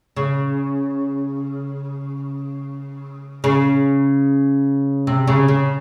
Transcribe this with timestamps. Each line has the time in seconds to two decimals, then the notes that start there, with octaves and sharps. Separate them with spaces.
0.17 C#3
3.44 C#3
5.07 C3
5.27 C#3
5.48 C#3